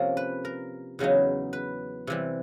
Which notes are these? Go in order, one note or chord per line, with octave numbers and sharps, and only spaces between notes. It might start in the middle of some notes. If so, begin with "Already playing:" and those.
Already playing: C3 F3 A#3 C#4
B4
A#4
E2 C#3 F#3 B3 D#4
B4
C3 E3 G3